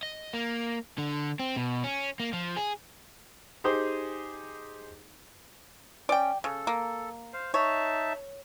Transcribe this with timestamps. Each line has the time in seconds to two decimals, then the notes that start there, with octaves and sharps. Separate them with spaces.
0.03 D#5
0.33 A#3
0.98 D3
1.39 C4
1.57 B2
1.84 C#4
2.20 A#3
2.33 F3
2.56 G#4
3.64 D#4 G4 G#4 C5
6.09 C#4 D5 G5
6.44 C#3 A4
6.67 A#3
7.33 C5 F5
7.54 D#4 C#5 E5 A5